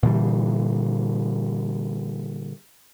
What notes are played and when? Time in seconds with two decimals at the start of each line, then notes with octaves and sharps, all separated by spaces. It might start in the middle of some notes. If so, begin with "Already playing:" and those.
0.03 A#2 D3 E3 G3